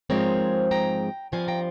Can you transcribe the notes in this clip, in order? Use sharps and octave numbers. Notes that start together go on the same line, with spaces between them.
G#2 F3 G#3 C4 A#4 C#5
G5 A#5
G2 F3 C4 F5 G#5
G5 A#5